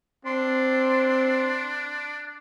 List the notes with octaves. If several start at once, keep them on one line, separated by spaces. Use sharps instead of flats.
C4 D4 C6